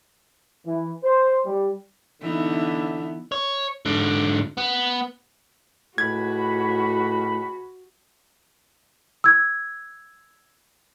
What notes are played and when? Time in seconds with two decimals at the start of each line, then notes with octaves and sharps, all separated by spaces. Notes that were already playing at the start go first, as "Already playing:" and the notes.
0.66 E3
1.03 C5
1.45 G3
2.22 D3 E3 B3 D#4 E5
3.32 C#5
3.86 G#2 D3
4.57 B3
5.98 C#2 A2 F#4 B4 B5 G#6
9.24 E6 G#6